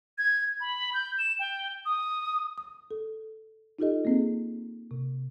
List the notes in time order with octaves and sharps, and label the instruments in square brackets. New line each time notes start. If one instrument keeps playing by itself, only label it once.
[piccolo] G#6
B5
G6
E7
G5
D#6
[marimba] D#6
A4
D#4 F4 G4 A4 D#5
A#3 C4 G#4
C3